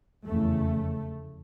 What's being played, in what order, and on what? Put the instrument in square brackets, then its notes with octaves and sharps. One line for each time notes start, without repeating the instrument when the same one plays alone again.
[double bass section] F1 E2 C#3 A3